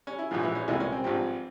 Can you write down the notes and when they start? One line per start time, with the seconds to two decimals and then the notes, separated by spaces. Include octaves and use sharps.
0.07 C#4
0.19 E4
0.31 A#1 G#2 E3 F3 F4
0.43 E3 E4
0.55 C#4
0.68 C2 A#2 E3 G#3 E4
0.80 C#4
0.92 C4
1.04 G#1 G2 F3 C4